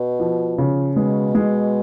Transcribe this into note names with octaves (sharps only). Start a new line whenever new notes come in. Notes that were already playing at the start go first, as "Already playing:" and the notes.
Already playing: B2
F3
C#3
B2 G#3
G#3